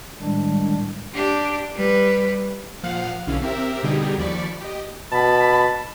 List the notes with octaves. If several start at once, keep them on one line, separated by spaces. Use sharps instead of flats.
A2 D#3 G3 G#3 D4
D4 G4
G3 B4
A#2 F3 F5 F#5
B1 D3 C#4 E4 F5
C4 G4 A#4 E5
B2 D3 G3 D#4 G4 G#4
D#2 F3 D5 B5 C#6
G4 D#5
B2 A5 B5